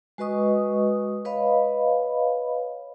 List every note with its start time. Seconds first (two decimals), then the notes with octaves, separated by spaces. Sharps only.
0.18 G#3 F#4 B4 D#5 C#6 D#6
1.25 B4 C#5 D#5 F5 B5